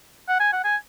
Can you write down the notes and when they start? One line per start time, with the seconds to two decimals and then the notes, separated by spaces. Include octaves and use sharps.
0.29 F#5
0.40 G#5
0.53 F#5
0.64 G#5